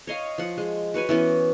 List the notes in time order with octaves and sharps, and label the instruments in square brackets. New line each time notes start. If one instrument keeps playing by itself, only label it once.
[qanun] C#5 D#5 F5
F3 F#5
G#3
F#4 B4 C#5 G#5
E3 B3 C#4